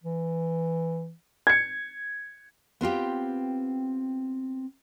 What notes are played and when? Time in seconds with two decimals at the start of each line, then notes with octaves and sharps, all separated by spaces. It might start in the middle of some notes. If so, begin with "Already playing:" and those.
0.03 E3
1.47 G#6 C#7
2.81 B3 C4 F4 G4